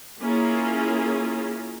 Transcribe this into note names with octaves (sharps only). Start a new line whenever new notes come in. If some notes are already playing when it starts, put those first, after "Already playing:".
A#3 C#4 E4 F4 G#4 A#4